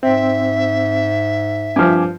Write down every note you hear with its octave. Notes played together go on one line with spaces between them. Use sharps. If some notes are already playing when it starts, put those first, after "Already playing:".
G#2 C4 E5
G2 F3 G#5 D6